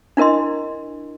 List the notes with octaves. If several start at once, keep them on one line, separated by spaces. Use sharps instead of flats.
D4 E4 A#4 D#5 C6